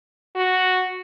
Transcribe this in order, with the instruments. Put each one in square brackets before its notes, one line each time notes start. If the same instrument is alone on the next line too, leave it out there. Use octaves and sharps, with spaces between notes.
[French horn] F#4